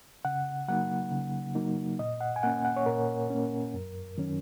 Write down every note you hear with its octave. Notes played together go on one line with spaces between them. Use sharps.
C#3 F#5
F#3 A#3 D#4 F#5
C#3
F#3 A#3 D#4
A#2 D#5
F#5
G#5
A#3 C#4 F#5
F#5
C#5
A#2 A#4
A#3 C#4
F#2
D#3 F#3 C#4